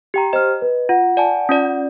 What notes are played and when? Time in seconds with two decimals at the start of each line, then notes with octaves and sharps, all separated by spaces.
0.14 G4 G5 A#5
0.33 C5 D#5 F6
0.62 B4
0.89 F4 F#5
1.17 D5 G#5 A5
1.49 C#4 F4 D5